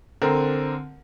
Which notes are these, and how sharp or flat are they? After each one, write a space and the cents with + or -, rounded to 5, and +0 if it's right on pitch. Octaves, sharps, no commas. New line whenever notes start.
D3 +0 C4 +0 A#4 +0